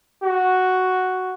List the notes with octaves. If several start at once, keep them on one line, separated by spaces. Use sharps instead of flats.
F#4